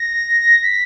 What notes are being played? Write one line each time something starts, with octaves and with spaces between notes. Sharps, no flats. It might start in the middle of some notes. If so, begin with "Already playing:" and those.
Already playing: A#6
B6